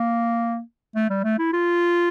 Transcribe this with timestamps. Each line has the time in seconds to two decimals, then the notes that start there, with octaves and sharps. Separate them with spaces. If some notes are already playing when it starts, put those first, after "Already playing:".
Already playing: A#3
0.96 A3
1.10 G3
1.24 A3
1.39 E4
1.53 F4